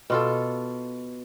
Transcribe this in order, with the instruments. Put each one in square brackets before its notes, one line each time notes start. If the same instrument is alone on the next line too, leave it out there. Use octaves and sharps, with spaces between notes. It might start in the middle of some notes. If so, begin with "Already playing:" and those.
[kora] B2 F4 A4